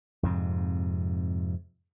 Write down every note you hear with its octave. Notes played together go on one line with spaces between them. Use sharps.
F2 G#2 C3